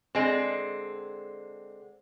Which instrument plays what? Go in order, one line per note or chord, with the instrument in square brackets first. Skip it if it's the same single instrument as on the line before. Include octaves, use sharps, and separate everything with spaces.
[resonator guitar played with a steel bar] D3 G#3 C4